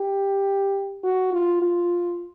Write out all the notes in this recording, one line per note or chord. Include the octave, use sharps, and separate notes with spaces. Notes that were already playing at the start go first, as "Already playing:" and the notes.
Already playing: G4
F#4
F4
F4